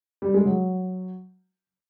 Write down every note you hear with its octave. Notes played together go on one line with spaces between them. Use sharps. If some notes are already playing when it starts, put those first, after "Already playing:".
G3
G#3
F#3